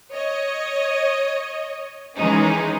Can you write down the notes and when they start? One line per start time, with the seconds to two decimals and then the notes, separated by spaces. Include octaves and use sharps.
0.12 C#5 D#5
2.17 D#3 E3 G#3 C#4 D#4